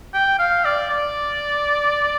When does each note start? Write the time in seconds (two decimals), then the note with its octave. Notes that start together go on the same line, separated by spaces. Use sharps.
0.14 G5
0.39 F5
0.65 D5
0.90 D5